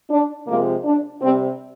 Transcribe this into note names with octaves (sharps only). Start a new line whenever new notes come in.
D4
C3 F3 G#3 A#3
D4
C3 G3 C4